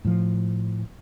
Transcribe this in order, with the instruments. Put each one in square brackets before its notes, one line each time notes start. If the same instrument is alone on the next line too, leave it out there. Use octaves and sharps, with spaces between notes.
[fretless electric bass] A2 F3